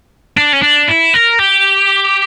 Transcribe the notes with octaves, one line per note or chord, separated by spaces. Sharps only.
D4
C#4
D4
E4
A#4
G4